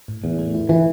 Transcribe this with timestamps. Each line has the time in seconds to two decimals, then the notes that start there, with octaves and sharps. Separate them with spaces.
0.08 A2
0.23 E2 A2
0.39 A3
0.54 E4
0.69 E3 E4